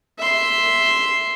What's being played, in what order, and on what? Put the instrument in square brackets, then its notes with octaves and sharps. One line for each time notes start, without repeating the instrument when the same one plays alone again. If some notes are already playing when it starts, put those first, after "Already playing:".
[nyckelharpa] E5 C6